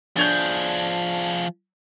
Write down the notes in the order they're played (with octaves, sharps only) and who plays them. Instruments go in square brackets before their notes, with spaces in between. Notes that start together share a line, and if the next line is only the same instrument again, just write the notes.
[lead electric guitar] F3 G#4 [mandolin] D4 C#5 G6